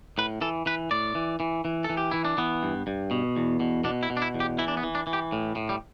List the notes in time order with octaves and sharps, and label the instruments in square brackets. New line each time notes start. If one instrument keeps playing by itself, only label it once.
[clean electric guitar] A2 B4
E3 A4
E3 B4
A2 D5
E3
E3
E3
A4
E3
G4
E3 E4
D4
E3 B3
G2
G2
B2
E2
B2
B2 D4
E4
B2
D4
E4
E2
G4
E3 E4
D4
B3
E3
D4
E3
G4
A2
A2
G3